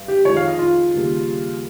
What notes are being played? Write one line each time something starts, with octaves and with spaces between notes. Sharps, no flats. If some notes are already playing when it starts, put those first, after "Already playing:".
Already playing: G2
G4
F2 D#3 G#3 C#5
F5
D#5
F4
D#2 C#3 G3 A#3